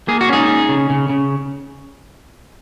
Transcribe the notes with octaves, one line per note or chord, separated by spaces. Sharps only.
A#3 G#4
F#4
C#4 D#4 G#4
C#4
C#3
C#3
C#3